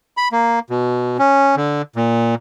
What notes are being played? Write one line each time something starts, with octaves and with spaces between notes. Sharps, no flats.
B5
A#3
B2
C#4
D3
A#2